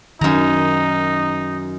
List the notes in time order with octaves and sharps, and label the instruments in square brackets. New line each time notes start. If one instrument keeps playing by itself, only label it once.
[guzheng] F#2 A#5 [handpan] D#3 [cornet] D#4